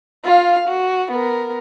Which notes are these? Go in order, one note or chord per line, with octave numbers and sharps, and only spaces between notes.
F4 F5
F#4
B3 A#4